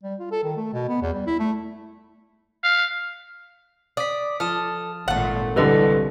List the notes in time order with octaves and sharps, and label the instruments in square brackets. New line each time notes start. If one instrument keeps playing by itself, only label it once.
[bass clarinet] G3
F4
A4
D#3
A3
B2
B3
E2
G3
E4
A3
[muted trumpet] F5
[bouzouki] D5 [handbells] D#6 B6
[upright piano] F3 [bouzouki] A4 [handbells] A5 D#6 F6
[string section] G#1 A#2 [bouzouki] A3 F#5
[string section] C2 [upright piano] D3 E3 G3 [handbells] A4 B4 D#5